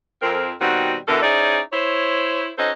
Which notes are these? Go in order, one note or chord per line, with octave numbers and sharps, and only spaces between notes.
F2 C4 A#4
B2 D#3 G3 C4 F#4
B2 D3 E3 A4 A#4
C#4 D#4 E4 G#4 C5 D5
E4 C5 C#5
C#4 D#4 F#4 A4 C5 D#5